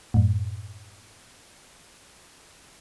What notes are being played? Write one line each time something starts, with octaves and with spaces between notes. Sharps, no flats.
F#2 A2